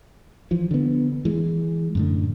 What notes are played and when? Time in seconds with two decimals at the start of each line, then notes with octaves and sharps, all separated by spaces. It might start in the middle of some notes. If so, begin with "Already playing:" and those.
0.51 E3 F3
0.71 D3 B3
1.25 E3 G#3
1.95 F#2 A2 D3